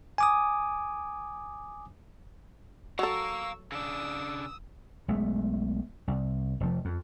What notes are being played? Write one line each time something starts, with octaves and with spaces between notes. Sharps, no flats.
G#5 D6 D#6
F#3 A4 F5 A#5 C#6 E6
C#3 D4 D#6 E6
B1 G#3 A3
C2
F1 F3
F2